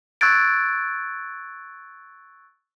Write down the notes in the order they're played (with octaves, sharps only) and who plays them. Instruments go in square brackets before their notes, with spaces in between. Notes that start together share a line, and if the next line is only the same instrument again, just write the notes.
[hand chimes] C#6 E6 F#6 G#6 A6 D7